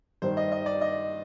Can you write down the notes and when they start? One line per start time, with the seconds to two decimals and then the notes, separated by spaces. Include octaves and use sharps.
0.22 G2 D#3 C5
0.37 D#5
0.52 D#5
0.66 D5
0.81 D#5